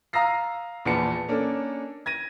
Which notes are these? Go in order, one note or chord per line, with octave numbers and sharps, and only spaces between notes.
F5 A#5 D#6 E6 A#6 C7
A#1 E2 B4 A5 C#7
A#3 C#4 D4 A4
G#6 A#6 D#7